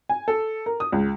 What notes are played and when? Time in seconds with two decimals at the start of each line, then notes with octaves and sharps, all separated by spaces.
0.09 G#5
0.28 A4
0.66 A#4
0.80 D#6
0.92 C#2